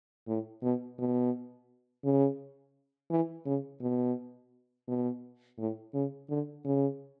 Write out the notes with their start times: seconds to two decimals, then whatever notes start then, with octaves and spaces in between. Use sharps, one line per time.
0.27 A2
0.63 B2
0.99 B2
2.04 C#3
3.10 E3
3.46 C#3
3.81 B2
4.88 B2
5.59 A2
5.94 C#3
6.29 D3
6.65 C#3